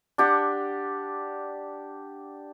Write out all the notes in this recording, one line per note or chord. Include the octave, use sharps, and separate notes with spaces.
D4 G4 F#5